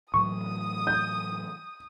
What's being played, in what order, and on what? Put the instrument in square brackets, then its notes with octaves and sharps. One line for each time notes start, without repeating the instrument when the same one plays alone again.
[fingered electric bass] A2 E3 F#3 [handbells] C#6 [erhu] D#6
[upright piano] G6